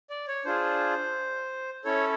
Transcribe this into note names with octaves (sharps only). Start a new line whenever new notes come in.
D5
C#5
D4 F4 G#4 C5
C#4 E4 A4 C#5